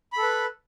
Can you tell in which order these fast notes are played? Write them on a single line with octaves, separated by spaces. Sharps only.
B5 A4 B4